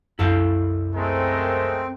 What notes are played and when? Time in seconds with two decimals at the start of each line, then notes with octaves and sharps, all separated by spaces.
0.19 C2 F#2 E4 A4 F5
0.95 G#3 A3 C4 A#4